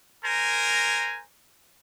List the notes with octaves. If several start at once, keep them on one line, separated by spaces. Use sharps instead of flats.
A#4 C5 G#5 A#5